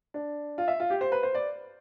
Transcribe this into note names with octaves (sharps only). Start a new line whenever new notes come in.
D4
F4
E5
F4
G4
C5
B4
C5
D5